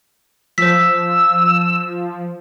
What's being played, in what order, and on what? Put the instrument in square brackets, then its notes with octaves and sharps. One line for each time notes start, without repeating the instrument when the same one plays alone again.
[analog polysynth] F3 [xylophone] C5 B6 [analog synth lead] E6